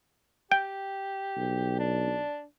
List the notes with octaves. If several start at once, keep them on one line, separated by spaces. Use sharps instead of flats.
G4 G5
B1
D4